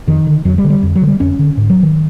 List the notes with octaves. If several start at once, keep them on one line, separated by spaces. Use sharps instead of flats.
F2 D#3
D3
F2 F#3
G3
D3
G3
F2
F#3
D3
G3
F2 C#4
D3
G#2
F#3
D#3